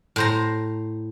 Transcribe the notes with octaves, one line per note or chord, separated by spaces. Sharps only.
A2 C5 A#5